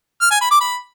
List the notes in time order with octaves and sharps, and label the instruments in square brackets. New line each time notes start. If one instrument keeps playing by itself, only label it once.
[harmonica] F6
G#5
B5
D6
B5